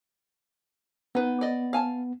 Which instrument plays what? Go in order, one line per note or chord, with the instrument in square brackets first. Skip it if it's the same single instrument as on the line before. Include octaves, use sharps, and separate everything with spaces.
[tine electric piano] B3 [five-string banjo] D#4 B4
[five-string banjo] D5 D#5
F5 G#5 A5